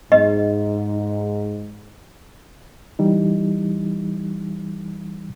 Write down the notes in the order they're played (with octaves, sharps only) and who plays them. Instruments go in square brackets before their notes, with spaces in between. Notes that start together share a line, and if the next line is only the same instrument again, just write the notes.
[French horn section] G#2 [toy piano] D#5
[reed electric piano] E3 G3 D#4